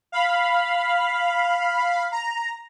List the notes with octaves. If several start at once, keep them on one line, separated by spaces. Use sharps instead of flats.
F5 B5
A#5